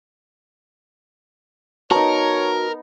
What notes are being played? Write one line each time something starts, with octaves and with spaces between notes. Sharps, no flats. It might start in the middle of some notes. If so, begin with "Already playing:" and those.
B3 D#4 F#4 A#4 C#5 A5 A#5